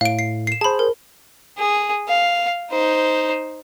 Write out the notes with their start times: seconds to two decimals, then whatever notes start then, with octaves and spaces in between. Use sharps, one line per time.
0.01 A2 F5 D7
0.19 C7
0.47 C7 E7
0.61 G#4 C5 A5 B5
0.79 A#4
1.58 G#4
2.09 F5
2.71 D#4 C5